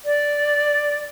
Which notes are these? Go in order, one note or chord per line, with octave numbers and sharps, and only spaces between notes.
D5